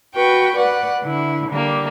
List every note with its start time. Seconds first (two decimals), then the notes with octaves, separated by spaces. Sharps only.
0.14 F#4 B4 G5 C#6
0.56 B4 D5 F#5
1.02 D3 E4
1.49 D3 G3 A#3